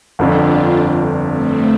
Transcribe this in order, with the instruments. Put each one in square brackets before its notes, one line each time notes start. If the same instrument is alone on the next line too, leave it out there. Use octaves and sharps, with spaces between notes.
[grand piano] G1 F2 D3 [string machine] D4 F4
[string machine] A3 C4